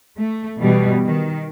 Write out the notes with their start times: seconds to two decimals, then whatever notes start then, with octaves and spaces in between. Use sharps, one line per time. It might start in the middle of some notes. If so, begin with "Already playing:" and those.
0.18 A3
0.60 B2 E3 G3
1.04 D#3